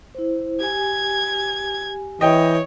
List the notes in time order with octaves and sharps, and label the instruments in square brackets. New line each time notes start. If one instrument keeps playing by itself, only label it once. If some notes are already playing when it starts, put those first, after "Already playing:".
[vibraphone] E4 C5
[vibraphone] G4 G#5 [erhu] G#6
[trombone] E3 [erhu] C#5 [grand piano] D#5 G5